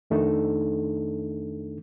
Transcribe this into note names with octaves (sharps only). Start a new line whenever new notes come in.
F2 D#3 A3 D4 D#4 A4